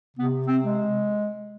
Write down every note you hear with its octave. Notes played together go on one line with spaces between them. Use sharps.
C3 B3
C4
G#3